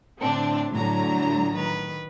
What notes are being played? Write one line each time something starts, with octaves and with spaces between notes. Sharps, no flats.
A2 D3 C4 D4
A2 D3 F#3 D4 A#5
D#3 B4